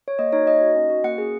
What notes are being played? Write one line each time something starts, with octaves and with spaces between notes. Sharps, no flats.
C#5
A#3 D#5
D#4 F#4 C#5
A#3 D#5
D#4 F#4
C#4
F#4
A#3 F#5
C#4 G#4